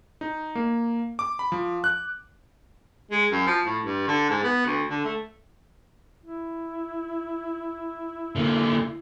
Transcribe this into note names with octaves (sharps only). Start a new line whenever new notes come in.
D#4
A#3
D6
B5
F3
F#6
G#3
F#2
F3
A2
G2
D3
G#2
B3
D2
D3
A3
E4
D3 A#3